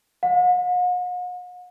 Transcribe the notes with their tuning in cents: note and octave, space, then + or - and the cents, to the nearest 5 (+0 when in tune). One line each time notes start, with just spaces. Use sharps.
F#5 -45